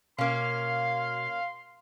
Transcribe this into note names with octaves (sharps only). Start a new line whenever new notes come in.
B2 A#3 C#4 F5 C6